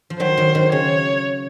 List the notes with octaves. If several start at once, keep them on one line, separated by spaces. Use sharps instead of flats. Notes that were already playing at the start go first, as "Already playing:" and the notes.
F3
D#3 F#3 C5
D#3
D#3
C#3 C#5